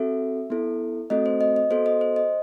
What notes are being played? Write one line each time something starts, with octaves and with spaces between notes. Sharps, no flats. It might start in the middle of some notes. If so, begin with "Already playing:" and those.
Already playing: C4 F#4 A4 E5
B3 E4 A4
A3 C4 F#4 A4 D#5
C5
D#5
D#5
B3 F#4 A4 C5
D#5
C5
D#5